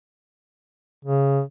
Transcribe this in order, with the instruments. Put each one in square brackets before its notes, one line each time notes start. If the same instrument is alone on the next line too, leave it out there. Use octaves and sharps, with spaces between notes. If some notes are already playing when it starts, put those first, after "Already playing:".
[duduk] C#3